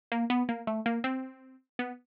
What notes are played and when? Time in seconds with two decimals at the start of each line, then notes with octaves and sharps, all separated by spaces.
0.12 A#3
0.30 B3
0.49 A#3
0.67 A3
0.86 A#3
1.04 C4
1.79 B3